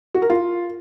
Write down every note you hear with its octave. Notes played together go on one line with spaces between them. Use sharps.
F#4
A#4
F4